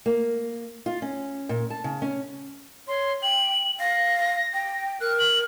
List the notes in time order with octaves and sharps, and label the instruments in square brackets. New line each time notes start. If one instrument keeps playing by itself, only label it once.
[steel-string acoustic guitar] A#3
F4
C#4
A#2
A5
C#3
C#4
[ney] C#5 [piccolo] C6
[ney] G5 [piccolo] F#7
[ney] F5 [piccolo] A#6
[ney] G5
[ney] A#4 [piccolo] F#6
[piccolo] F#7